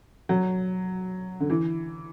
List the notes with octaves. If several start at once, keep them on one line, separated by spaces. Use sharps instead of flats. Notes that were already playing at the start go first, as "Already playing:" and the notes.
F#3
D3
E3